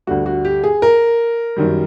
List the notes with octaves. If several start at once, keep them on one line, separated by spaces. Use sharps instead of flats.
D2 D3 G3 F#4
F#4
G4
G#4
A#4
F#2 D#3 G3